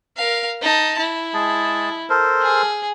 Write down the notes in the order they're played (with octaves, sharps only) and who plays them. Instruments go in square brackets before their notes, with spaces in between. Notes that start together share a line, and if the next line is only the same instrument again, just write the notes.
[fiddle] A#4 F5
D#4 A5
E4
[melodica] G#3 G#4 A5
A4 A#4 C5
[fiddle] G#4